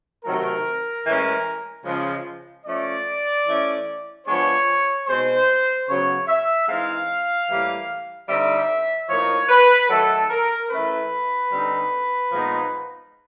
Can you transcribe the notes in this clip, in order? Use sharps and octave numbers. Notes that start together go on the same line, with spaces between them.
C3 D#3 F#3 A3 A#4
A2 E3 G#3 C#4
C#3 F3 G#3
F3 A3 C#4 D5
E3 A3 C#4
F3 G#3 B3 D4 C#5
B2 G#3 C4 D#4 C5
C#3 F#3 B3 C#5
E5
E3 G#3 C4 D#4 F5
A2 E3 G3 A#3
D3 G3 C4 D#4 E5
A2 F3 A#3 D#4 C#5
B4
D#3 F#3 A3 A4
A#4
E3 A3 C#4 B4
D3 G3 C4 D#4
A#2 F3 G#3 B3 D#4